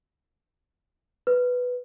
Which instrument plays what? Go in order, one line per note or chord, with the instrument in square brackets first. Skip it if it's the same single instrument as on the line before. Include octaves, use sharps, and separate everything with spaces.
[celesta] B4